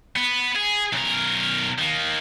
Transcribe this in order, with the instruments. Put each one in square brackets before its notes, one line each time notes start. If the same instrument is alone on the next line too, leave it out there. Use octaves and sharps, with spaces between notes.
[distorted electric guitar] B3
G#4
B1 A#4
D#3 A#3